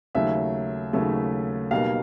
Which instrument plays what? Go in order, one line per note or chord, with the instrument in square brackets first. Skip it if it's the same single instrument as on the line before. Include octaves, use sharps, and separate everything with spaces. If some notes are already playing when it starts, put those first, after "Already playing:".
[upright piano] D#2 C#3 F#3 A3 E5
D#2 C#3 F#3 A3
B1 B2 G3 A#3 F5